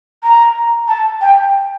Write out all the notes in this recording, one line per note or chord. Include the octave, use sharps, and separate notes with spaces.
A#5
A5
G5